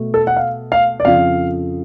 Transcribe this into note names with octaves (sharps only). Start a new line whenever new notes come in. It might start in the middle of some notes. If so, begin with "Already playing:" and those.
Already playing: B2 A3
A4
F#5
F5
F5
D5
F2 C#3 F3 F5